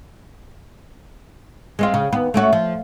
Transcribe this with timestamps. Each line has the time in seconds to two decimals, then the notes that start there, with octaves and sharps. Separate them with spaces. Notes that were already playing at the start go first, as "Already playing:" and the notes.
1.79 G#3 C4 F4
1.94 C#3
2.12 D#2 B3
2.34 A3 C#4 F#4
2.53 F3